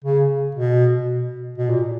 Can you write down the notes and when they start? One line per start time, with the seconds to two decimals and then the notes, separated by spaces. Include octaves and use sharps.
0.04 C#3
0.55 B2
1.58 B2
1.69 A#2